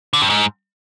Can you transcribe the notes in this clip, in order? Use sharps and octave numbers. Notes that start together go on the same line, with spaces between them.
D3
G2
G#2